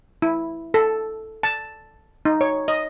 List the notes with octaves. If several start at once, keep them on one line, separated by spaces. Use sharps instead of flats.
E4
A4
A5
D#4
C#5
D#5